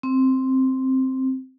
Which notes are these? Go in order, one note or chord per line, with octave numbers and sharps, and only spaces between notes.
C4